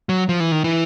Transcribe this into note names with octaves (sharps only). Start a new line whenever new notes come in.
F#3
F3
E3
D#3
E3